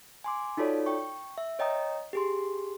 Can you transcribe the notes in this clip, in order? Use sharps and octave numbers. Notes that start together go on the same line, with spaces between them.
G#5 C6 D6
D#4 F4 F#4 A4 C#5 D5
G5 C#6
E5
C#5 D#5 G5 A#5 D#6
G4 G#4 C6